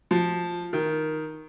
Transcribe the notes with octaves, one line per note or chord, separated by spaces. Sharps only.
F3
D#3